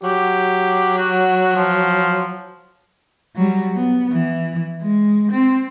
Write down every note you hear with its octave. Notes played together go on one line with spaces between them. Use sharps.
F#3 G4
F#4
F3
F#3 G3
B3
E3
G#3
C4